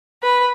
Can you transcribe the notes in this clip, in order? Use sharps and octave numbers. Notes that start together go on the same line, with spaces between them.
B4